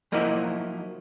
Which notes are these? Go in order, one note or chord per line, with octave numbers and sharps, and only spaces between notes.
F3 F#3 A#3 D#4 E4 D#5